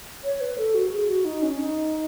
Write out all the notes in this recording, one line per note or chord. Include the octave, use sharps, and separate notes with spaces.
C#5
B4
A4
F#4
G#4
F#4
D#4
C#4
D#4